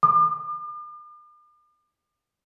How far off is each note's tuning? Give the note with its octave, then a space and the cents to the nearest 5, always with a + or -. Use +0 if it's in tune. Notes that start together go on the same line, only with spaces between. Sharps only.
D6 +45